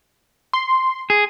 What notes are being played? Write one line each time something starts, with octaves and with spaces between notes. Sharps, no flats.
C6
G#4